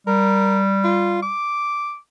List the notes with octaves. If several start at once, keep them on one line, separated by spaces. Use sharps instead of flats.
G3 A#4
F4
D6